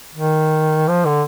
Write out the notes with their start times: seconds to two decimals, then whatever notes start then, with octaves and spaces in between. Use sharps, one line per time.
0.15 D#3
0.88 F3
1.05 D3